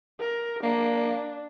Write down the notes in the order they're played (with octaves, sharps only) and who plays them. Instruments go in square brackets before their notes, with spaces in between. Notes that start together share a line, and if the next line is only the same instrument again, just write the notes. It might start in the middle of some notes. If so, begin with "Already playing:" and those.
[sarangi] A#4
[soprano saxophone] A#3 [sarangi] D4